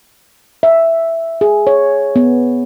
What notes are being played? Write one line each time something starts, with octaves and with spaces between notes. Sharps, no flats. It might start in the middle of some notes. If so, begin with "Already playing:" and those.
E5
G#4
C#5
B3